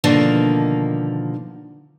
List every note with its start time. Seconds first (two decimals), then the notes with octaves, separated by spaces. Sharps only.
0.04 B2 D3 D#3 F3 A#3